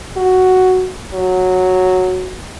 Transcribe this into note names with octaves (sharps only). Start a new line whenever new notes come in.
F#4
F#3